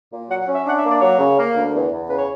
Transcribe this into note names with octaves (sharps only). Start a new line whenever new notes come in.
A#2
F#3 F#5
F#5
C#4
E5
D4 F#5
E5
A#3
D5
F#3 C#5
C#3
A#3
D2
E2
E2
C#3 B4
C#5